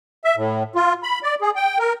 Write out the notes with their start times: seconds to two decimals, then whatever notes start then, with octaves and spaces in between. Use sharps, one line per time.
0.24 E5
0.36 A2
0.75 F4
1.03 B5
1.23 D5
1.41 G#4
1.56 G5
1.79 A#4